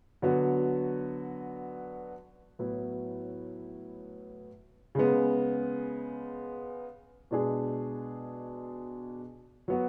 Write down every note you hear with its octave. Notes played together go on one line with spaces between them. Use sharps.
D3 F#3 B3 F#4
A2 F#3 B3 E4
C#3 G#3 B3
B2 G#3 D4 G#4
F#3 B3 F#4